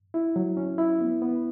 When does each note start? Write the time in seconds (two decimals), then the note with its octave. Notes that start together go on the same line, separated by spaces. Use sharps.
0.14 E4
0.36 F#3
0.57 C#4
0.78 E4
1.01 B3
1.22 B3